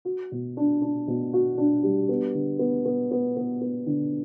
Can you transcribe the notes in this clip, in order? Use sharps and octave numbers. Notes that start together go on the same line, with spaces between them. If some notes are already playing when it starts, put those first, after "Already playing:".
F#4
B2
D4
D4
B2
F#4
D4
G3
B3
D3
B3
B3
B3
B3
B3
D3